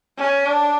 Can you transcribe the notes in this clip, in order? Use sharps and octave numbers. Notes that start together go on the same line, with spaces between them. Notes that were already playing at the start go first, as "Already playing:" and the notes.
C#4
D4